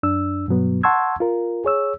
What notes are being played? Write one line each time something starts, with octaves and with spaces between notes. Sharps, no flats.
F#2 D4 E6
G2 B2 F#3 B3
F#5 A5 C6 C#6 E6 G#6
F4 A#4
G#4 C#5 E6